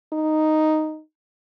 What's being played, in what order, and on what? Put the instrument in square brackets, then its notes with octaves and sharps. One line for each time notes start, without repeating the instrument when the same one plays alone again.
[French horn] D#4